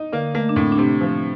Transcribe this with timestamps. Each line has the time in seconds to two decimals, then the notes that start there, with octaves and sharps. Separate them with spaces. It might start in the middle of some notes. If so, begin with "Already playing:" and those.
Already playing: D#4
0.13 D3 A#3
0.35 A3 A#3
0.49 D4
0.56 A2 C4
0.72 D4
0.78 C3 C4
1.01 F3